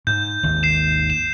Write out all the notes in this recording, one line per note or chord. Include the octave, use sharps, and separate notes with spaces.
G#2 G6
G#1 D#2
C7 E7
E7